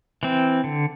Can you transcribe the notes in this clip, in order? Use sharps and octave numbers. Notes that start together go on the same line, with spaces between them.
E3 C4
D3